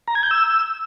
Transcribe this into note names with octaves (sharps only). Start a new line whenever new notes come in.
A#5
G#6
G6
E6